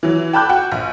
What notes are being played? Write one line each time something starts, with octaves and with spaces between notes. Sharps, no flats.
E3 F#3
G5 A5 B5 D6 F#6 G6
F#4 F#5 G5
A#1